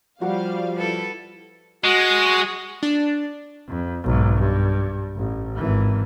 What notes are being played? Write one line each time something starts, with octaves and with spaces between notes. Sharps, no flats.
F3 G3 F#4 F5 C#6 D6
E4 A4 B4
G#3 F#4 C#6 D#6
D4
F2
B1 G#2
G2
A1
G#1 E3